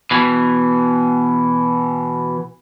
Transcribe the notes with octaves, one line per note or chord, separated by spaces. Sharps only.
B2 E3